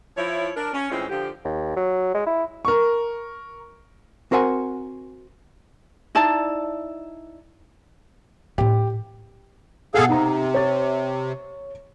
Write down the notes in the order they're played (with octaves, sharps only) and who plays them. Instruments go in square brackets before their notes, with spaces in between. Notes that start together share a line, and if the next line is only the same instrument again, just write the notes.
[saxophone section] F3 E4 C#5
D4 A#4
C#4
A2 E3 G#3 C4 C#4 F4
D3 F3 G4
[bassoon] D#2
F#3
G#3
E4
[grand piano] A#4 C#6
[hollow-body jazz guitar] C4 F#4 A#4 C5 F#5 G#5
[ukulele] D#4 E4 D5 A5
[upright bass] A2 C4 [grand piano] G4
[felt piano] B2 F#5 [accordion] G#4 A4 F5
[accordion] C3 [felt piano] D#4 A#5
[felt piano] C#5 A6